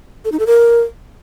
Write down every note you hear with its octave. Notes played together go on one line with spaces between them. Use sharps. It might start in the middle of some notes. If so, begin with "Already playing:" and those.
A4
D#4
A4
A#4